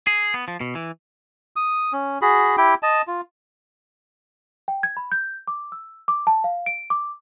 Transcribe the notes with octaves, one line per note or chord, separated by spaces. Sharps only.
G#4
B3
F3
B2
E3
D#6
C#4
F#4 G#4 B5
E4 G4 G5
D#5 A5
F4
G5
G#6
B5
G6
D6
E6
D6
A5
F5
D7
D6